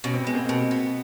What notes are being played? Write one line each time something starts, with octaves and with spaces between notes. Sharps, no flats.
B2 C#4
C4
G#3 B3
A#3 C4
B2
B3